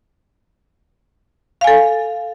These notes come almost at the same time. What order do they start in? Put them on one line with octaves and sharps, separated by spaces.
F5 G#5 A4